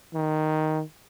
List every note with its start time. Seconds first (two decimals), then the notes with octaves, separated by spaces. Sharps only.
0.14 D#3